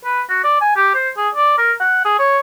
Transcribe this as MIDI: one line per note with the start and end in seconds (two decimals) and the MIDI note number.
0.04 0.22 71
0.30 0.42 66
0.44 0.56 74
0.61 0.73 80
0.76 0.89 67
0.95 1.09 72
1.17 1.29 68
1.35 1.56 74
1.58 1.72 70
1.80 2.00 78
2.05 2.15 68
2.19 2.40 73